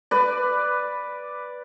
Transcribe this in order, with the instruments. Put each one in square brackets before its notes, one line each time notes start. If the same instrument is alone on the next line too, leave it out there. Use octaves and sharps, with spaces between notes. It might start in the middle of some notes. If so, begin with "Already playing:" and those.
[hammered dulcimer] B4 D5